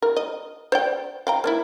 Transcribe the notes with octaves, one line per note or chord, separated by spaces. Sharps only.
A#4
D#5
C5 D5 G5
F5 G5 A#5
A#3 D4 E4